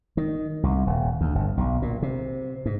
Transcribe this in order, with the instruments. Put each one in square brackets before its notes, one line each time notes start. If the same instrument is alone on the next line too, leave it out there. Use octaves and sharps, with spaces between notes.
[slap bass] D#3
C2
D#1
D2
G1
B1
A#2
C3
G#2